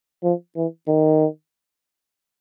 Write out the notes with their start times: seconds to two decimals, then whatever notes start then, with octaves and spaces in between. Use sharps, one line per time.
0.24 F3
0.56 E3
0.87 D#3